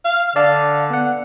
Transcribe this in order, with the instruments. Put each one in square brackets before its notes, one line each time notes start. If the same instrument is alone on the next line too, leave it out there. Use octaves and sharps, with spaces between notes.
[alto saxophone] F5
[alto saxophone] D3 [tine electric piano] D5 F5 A5
[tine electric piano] B3 F#5